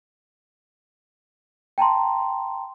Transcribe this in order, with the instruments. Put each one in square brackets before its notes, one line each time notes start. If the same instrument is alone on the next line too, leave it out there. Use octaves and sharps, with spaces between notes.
[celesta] G5 A5 A#5 C6